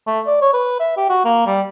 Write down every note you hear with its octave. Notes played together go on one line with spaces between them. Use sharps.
A3
D5
C#5
B4
E5
G4
F#4
A#3
G3